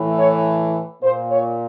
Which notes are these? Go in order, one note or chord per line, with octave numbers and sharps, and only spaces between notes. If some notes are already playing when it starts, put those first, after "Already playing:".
Already playing: A2 E3
C#5
A#2 C5
C#5